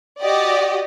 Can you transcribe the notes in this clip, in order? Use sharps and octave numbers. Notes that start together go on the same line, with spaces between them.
F#4 G4 D5 D#5